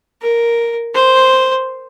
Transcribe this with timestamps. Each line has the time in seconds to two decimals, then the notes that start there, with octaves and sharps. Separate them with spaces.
0.21 A#4
0.94 C5